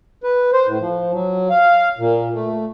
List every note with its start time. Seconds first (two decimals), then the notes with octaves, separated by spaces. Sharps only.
0.23 B4
0.53 C5
0.67 A2
0.80 F3
1.12 F#3
1.49 F5
1.99 A#2
2.33 A3